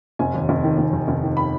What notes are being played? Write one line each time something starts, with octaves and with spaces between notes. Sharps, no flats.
F1 G#5
D#2
F1
D#3
F1
D#2
F1
D#3
B5